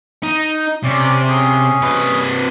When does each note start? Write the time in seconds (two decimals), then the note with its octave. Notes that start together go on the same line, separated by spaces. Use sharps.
0.24 D#4
0.84 C3 C#4 D5
1.29 C#4 G#4
1.82 C3 B4